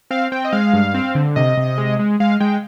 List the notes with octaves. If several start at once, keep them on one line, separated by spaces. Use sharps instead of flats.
C4 F5
C4 G5
D#5
G#3 F5
G2
C4
D3
C3 D#5
C3
G#3
G#3
G#3 F5
G#3 G5